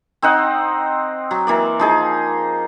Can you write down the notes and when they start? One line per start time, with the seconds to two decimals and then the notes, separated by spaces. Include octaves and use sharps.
0.22 C4 D#4 D#5 F#5
1.31 F#3
1.47 E3 A#3 D5
1.79 F3 D#4 G#4